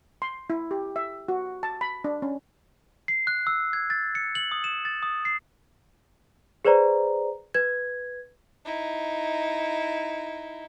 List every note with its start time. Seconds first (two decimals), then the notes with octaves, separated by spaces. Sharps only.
0.22 C6
0.50 E4
0.71 G4
0.96 E5
1.29 F#4
1.63 A5
1.81 B5
2.04 D4
2.22 C#4
3.08 C7
3.27 F#6
3.47 E6
3.73 G#6
3.90 A6
4.15 C#7
4.35 F#7
4.52 D#6
4.64 E7
4.85 A6
5.03 D#6
5.25 C7
6.65 G#4 B4 C5 D5 A#5
7.54 B4 G#6
8.65 D#4 E4